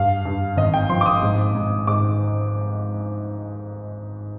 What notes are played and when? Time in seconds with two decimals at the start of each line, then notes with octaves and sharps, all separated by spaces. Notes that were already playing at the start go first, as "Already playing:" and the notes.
Already playing: G2 F5
0.25 G2
0.57 G#1 D#5
0.74 G5
0.89 F3 C6
1.01 D6
1.06 D#6
1.22 G#2
1.55 G#2
1.87 G#2 D6